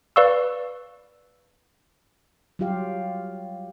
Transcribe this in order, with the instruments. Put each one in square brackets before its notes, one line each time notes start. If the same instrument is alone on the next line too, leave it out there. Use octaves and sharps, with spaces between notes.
[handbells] B4 D5 F5 C#6 E6
[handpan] F#3 G3 F4 G4 F5